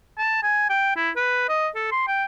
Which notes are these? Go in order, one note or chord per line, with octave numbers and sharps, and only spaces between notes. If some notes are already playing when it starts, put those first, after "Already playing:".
A5
G#5
G5
E4
B4
D#5
A4
C6
G5